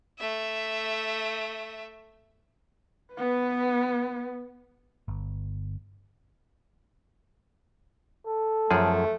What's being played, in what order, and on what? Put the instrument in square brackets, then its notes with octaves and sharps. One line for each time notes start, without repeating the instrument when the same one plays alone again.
[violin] A3 E5
[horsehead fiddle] B3 B4
[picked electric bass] G1
[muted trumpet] A4
[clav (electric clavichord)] F#2 F3 G#4 [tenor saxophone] A3